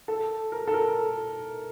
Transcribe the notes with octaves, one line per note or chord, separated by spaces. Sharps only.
A4
A#4
A4
A#4